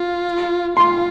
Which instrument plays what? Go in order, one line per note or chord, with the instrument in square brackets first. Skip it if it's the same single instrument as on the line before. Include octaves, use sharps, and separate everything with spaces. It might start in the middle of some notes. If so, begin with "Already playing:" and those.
Already playing: [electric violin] F4
[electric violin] F4 [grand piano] C6